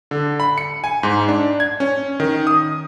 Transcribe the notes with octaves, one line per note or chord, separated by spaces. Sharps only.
D3
B5
C#7
G#5
G#2
D4
G#6
C#4
D#3
D#6